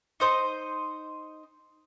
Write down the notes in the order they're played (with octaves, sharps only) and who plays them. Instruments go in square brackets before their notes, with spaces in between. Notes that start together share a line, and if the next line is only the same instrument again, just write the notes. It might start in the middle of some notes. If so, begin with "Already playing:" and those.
[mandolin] D#4 C5 D#5